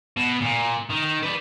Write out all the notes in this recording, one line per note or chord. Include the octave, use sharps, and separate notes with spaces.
B2
A#2
D#3
B4 D5